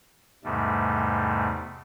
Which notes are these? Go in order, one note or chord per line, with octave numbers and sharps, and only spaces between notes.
E2 G#2 C3 G3 A3